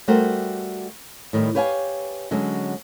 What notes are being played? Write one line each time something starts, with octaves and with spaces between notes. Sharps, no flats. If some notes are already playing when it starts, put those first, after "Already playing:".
G3 A3 F#4 A#4 C5 G5
A2 D#3 G3
G4 B4 C#5 F5 G5 G#5
D3 F#3 G#3 C#4